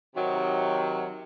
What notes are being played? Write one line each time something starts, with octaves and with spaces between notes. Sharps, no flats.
C3 D#3 F#3